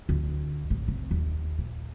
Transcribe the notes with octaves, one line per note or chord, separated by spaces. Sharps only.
D2
A1
C3
D#2
A#2